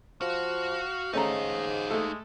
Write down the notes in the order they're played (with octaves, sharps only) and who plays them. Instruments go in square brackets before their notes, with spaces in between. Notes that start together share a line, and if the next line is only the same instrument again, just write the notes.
[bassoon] F3 [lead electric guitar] F#4 [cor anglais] F5
[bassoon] G#2 [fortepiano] A3 C#4 A#5 [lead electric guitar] D#4 F5 [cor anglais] D#5
[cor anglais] G#3 [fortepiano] A3 A4